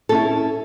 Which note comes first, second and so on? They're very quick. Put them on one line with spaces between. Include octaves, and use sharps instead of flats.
A4 C#4 E4